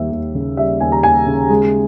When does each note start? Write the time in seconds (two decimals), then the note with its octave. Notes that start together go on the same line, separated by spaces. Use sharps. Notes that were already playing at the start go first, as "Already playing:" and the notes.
Already playing: D#2 G3 E5
0.11 D#2
0.35 C#3
0.57 G3 E5
0.81 D#2 G#5
0.92 A#5
1.03 D#2 G#5
1.26 C#3
1.50 G#3